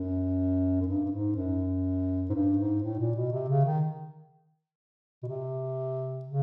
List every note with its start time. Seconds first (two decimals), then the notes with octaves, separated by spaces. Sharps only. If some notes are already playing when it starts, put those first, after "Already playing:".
Already playing: F#2
0.81 F#2
0.88 G2
1.05 G2
1.11 G#2
1.36 F#2
2.29 G#2
2.34 G2
2.58 G#2
2.83 A2
2.99 A#2
3.16 B2
3.32 C3
3.48 C#3
3.65 D#3
5.23 B2
5.28 C3
6.25 C#3